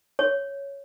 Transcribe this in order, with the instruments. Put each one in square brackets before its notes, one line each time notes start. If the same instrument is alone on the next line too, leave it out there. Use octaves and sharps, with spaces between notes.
[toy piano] C#5